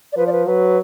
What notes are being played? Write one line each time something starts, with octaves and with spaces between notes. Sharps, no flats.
D5
F3 B4
D5
B4
F#3 B4